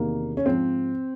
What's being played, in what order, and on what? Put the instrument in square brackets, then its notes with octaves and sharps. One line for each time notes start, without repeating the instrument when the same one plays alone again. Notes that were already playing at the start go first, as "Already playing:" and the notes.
Already playing: [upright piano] E2 C3 D#3 A#3
C#4
G#2 F3 C4